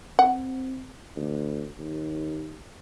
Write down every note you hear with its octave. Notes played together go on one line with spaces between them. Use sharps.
C4 F#5
D2
D#2